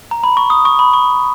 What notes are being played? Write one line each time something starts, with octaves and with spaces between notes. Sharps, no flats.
A#5
B5
C#6
D#6
C#6
B5
C#6